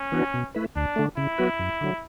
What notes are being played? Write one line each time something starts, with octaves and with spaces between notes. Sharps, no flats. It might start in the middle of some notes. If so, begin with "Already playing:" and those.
Already playing: C#4
E3 B3 D4 F#4
B2
A3 E4 B4
D2 D4
D3 A3
C#3 E4
F#3 B3 F#4 B4
F#2
D3 F#3